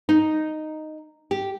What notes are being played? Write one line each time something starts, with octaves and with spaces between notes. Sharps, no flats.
D#4
G4